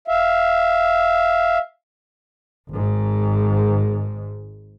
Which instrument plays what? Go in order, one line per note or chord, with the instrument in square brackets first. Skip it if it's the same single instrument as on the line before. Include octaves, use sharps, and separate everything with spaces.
[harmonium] E5 F5
[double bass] G#1 G#2